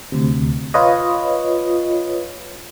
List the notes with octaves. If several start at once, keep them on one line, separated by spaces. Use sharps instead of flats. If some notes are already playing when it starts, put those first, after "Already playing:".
D2 C3
F4 B4 C#5 D#5